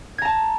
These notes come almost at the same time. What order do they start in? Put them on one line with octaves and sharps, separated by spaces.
G#6 A#5 A5